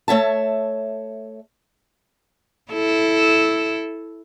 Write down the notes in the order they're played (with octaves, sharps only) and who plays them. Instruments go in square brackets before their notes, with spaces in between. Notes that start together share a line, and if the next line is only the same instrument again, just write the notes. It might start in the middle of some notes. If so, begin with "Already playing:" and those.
[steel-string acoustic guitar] A3 C#5 E5 A5
[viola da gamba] E4 A4